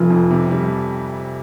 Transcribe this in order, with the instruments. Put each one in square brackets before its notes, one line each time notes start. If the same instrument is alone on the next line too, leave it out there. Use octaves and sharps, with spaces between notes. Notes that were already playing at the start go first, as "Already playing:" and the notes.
Already playing: [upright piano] F1 [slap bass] F3
[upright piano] F2
C3
G3